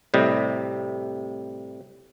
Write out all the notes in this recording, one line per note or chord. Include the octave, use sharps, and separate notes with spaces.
A2 C3 G3 D#5